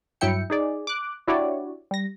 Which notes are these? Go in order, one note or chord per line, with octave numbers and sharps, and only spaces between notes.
G2 F#3 E4 E5 G5 C#7
D#4 G#4 D5
D6 F#6
D4 E4 F#4 G4 C#5 D5
G3 A#6